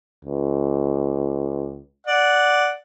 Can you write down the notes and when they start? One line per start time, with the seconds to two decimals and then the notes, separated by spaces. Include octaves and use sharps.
0.25 C#2
2.07 D5 F#5